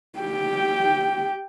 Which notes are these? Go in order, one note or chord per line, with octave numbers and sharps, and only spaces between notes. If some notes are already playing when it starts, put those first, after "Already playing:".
G4 G5